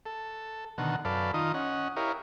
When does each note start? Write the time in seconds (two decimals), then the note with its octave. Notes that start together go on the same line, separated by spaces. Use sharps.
0.06 A4
0.78 B2 D3 D#3 F#5
1.05 F#2 A4 B4 D5 F5
1.34 D#3 D#4 F4 D#6
1.54 C#4 D#5 F#5
1.96 E4 G4 A#4 C#5 D#5 F5